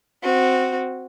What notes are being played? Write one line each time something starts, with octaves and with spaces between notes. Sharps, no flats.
C4 F#4